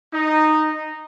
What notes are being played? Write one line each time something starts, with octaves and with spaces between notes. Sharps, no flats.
D#4